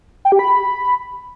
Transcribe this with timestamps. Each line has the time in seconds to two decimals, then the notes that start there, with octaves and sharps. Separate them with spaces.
0.25 G5
0.32 G4
0.39 B5